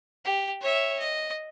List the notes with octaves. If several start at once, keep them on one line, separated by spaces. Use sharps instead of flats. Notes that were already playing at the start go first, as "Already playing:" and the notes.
G4
C#5 E5
D#5